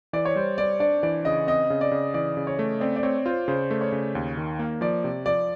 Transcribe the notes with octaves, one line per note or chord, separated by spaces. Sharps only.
E3 D5
C#5
G3 C5
G3 D5
D4 D5
E3 D5
C#3 D#5
C4 D#5
C#3
D5
C#3
E3 D5
C#3
C#5
A3
C4 D5
D5
C4 C#5
F4 C5
C#3 C5
A3
C#5
C#3
D#2
D#3
A#3
F3 D5
C3
F3 D5